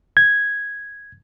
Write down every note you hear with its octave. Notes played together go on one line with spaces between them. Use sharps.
G#6